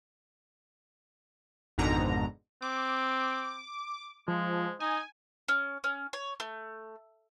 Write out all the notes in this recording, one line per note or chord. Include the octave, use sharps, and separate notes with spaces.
G#1 F2 G#2 B2 D3 A#5
C4 D6
F3 G#3
D#4 G#5
C#4
C#4
C#5
A3